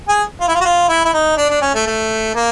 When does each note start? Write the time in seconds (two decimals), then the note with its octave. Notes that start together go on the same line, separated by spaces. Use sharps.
0.08 G#4
0.40 F4
0.48 E4
0.54 F4
0.61 F#4
0.65 F4
0.89 E4
1.05 E4
1.13 D#4
1.37 D4
1.50 D4
1.62 C#4
1.75 A3
1.86 A3
2.35 A#3